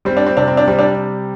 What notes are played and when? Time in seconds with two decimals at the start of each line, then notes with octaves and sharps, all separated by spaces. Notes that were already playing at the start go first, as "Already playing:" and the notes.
0.05 G3 C4
0.17 D4
0.26 C4
0.37 C3 D4
0.48 C4
0.57 D4
0.67 G3 C4
0.79 D4